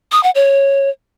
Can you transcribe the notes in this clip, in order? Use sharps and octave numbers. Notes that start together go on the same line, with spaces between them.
D#6
F#5
C#5